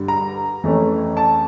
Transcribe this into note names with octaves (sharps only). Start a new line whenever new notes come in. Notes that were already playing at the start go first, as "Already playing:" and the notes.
Already playing: G2 D3 G3
A#5
F2 E3 A3 C#4
A5